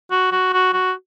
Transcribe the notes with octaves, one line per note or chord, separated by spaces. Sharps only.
F#4
F#4
F#4
F#4